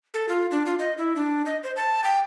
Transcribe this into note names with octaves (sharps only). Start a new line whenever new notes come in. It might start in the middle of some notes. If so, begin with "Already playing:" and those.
A4
F4
D4
F4
D#5
E4
D4
D#5
C5
A5
G5